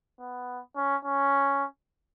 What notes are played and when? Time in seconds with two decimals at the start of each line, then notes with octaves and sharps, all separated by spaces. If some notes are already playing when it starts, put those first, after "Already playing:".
0.20 B3
0.76 C#4
1.05 C#4